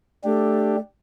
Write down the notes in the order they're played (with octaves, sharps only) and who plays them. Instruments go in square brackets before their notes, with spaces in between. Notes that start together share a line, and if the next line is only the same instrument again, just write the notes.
[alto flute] A3 [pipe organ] D4 G4